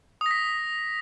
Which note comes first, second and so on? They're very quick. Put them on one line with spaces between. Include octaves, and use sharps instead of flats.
D#6 A#6 B6